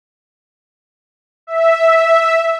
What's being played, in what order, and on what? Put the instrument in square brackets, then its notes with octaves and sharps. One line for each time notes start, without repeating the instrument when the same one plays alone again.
[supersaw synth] E5